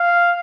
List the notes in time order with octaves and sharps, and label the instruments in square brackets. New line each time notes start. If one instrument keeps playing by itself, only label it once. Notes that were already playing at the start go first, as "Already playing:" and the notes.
Already playing: [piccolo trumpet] F5